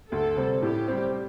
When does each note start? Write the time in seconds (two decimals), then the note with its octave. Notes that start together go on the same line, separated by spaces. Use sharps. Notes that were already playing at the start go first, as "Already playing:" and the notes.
0.11 D2 A4
0.36 C3 G3 C4
0.62 A2 G4
0.88 G3 C4